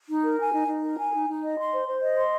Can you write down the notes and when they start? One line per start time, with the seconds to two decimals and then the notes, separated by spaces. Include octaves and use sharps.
0.08 D#4
0.23 A#4
0.38 G#5
0.53 D#4
0.67 D#4
0.83 A#4
0.98 G#5
1.13 D#4
1.28 D#4
1.42 D#5
1.58 C6
1.73 C5
1.88 C5
2.02 D#5
2.17 C6